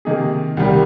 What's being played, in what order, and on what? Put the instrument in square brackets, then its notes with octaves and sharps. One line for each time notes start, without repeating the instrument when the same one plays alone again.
[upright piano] C3 D#3 A#3 D#4 G#4
C2 C3 D#3 G3